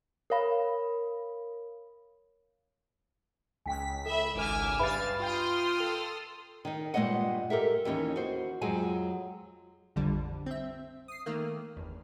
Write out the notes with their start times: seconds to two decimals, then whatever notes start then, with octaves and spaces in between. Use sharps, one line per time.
0.30 A#4 C#5 F5 B5
3.66 C#2 G5 G#5 B6
4.06 A4 E5 B5
4.35 G#1 C#2 G#5 D6 E6 F6
4.79 G2 B4 E5 F5 B5 A6
5.20 F4 G5 C6 D#6 F6
5.80 A4 F7
6.65 D#3 D#4
6.94 G2 A#2 G#3 A3 D#5 F#5
7.50 G4 A4 A#4 E5
7.85 D#2 E3 C#4 D#4
8.16 F#4 C5
8.61 F2 F#3 G#3 G#5
9.96 A#1 F2 D3 G3
10.46 C4 E5
11.08 D#6 C7
11.26 D#3 A3 A#3
11.76 G1 E2